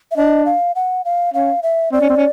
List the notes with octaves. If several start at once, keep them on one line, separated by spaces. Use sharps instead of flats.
E5
D4 D#5
F5
F#5
F5
C#4 F5
E5
C4 D5
C#4
C4
C#4